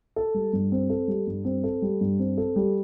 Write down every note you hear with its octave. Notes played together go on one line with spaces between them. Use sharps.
A4
G3
G2
C4
A4
G3
G2
C4
A4
G3
G2
C4
A4
G3